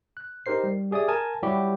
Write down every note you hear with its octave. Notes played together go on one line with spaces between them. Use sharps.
F#6
D#4 G4 A#4 C5 C7
G3
G4 G#4 D5 E5 D#6
A#4 G#5 A5
F#3 G3 E4 F#4 G4